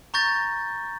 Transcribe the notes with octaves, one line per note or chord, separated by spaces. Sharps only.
A#5 C#6 G6 A6 A#6